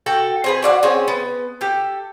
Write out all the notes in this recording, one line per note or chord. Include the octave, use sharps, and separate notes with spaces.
F#4 A4 G5
C4 G#4 B4
F#4 D5 E5 F#5
C4 C#4 G#4
B3
G4 A4